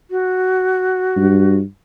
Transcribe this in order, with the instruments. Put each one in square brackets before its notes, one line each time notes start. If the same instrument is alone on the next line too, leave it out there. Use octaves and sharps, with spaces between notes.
[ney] F#4
[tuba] G2